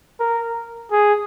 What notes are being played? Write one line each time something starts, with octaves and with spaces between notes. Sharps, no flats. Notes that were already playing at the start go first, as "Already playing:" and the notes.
A#4
G#4